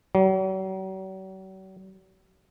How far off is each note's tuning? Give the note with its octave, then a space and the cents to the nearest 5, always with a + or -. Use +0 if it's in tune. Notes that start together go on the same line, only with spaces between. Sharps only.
F#3 +45